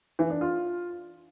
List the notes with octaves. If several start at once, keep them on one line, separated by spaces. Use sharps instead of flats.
E3
D4
F4